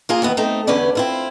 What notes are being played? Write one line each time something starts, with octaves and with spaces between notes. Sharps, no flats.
A#3 F4 G#4
D#2 E3 B3
A3 C4 D#4
E2 D3 C#4 E4 B4 D5
C4 E4 F4